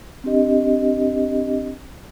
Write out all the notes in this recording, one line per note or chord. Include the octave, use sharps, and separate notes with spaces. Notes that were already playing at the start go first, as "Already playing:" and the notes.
C4 D4 G4 D#5